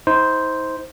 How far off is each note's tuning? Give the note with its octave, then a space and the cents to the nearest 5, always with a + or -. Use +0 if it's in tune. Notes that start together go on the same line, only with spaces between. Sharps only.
D#4 +45 C5 +0